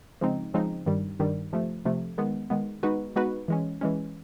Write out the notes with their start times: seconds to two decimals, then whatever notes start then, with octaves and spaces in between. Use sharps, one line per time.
0.21 C#3 F3 G#3 C4 D#4
0.54 C#3 F3 G#3 C4 D#4
0.86 G2 D#3 G3
1.19 G2 D#3 G3
1.53 C3 F3 A3
1.85 C3 F3 A3
2.18 D#3 G#3 B3
2.50 D#3 G#3 B3
2.83 G#3 B3 D#4 F#4 B4
3.16 G#3 B3 D#4 F#4 B4
3.48 E3 G#3 C#4
3.81 E3 G#3 C#4